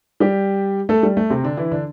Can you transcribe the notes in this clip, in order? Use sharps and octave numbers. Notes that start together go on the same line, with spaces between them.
G3 G4
A3 A4
G3
A3
C3 C4
D3 D4
E3 E4
D3 D4